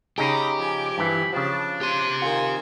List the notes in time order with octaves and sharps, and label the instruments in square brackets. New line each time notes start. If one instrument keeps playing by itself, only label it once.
[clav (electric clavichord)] C#3 D#4 G#4 [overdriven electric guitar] G4 [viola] A#5 B5 [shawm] D6
[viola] F3 G#5
[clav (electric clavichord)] G2 E3 [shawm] B5
[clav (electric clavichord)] C#3 F3 [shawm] D4 [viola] A5
[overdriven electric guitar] G4 C6 [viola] C5
[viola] D#3 G#5 [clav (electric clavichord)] F4